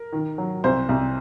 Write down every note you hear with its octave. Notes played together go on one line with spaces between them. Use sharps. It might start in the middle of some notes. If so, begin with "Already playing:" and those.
Already playing: A#4
D#3
F#3
C2 C5
C2